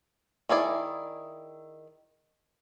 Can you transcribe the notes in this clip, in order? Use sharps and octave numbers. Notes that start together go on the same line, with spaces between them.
D#3 E4 G#4 D5